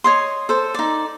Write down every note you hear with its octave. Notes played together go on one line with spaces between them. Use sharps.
C#5 D#5 C6
A4 C5
D#4 D5